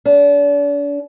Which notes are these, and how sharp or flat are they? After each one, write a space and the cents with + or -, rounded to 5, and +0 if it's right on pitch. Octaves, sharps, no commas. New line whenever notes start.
D4 -40